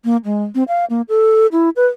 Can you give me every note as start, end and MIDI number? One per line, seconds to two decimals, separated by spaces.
0.04 0.17 58
0.25 0.44 56
0.55 0.63 60
0.68 0.85 77
0.90 1.02 58
1.09 1.47 69
1.52 1.69 64
1.76 1.87 71